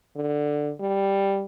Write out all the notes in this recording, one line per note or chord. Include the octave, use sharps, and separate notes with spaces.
D3
G3